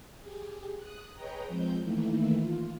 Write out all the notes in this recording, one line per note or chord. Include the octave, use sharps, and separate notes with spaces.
G4 G#4
D#6 F#6
G#4 B4 C#5 D#5 G5 A#5
F3 G#3 C4 G6
D#3 E3 A3 A#3 E4
F4